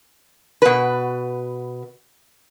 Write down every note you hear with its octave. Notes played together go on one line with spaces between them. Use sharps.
B2 B4